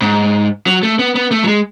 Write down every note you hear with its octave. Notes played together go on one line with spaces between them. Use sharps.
G#2
F#3
A3
B3
B3
A3
F#3
G#3